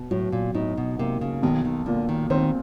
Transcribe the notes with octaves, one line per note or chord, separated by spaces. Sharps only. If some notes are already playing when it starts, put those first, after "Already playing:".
Already playing: B2
A2 F#3
A#2
A2 D#4
B2
C3 A#3
C#3
B1 D#3
D#3
A#2 D3
D#3
D#3 C4